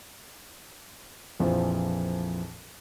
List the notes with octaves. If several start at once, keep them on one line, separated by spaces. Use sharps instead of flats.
A#1 F2 A#2 E3 F3